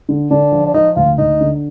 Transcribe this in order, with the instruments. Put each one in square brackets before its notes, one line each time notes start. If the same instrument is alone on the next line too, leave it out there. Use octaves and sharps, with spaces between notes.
[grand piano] D3
[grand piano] D3 [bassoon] D4
[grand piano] F3
[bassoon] D4
[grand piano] F3 [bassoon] D#4
[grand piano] D2 [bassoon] F4
[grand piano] D2 [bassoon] D#4
[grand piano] D3